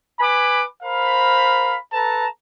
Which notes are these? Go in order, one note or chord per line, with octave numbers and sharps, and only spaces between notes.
B4 G#5 B5 D6
A#4 C5 F5 B5
A4 B4 A5 A#5